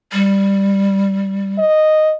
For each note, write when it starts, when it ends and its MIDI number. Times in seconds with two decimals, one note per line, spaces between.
0.13 1.58 55
1.58 2.15 75